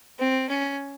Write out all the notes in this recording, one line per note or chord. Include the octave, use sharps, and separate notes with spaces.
C4
C#4